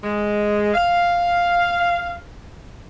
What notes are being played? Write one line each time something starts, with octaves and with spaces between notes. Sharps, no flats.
G#3
F5